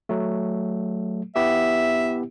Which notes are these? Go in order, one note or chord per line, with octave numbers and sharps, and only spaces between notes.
F#3 A3
B3 E4 G4 E5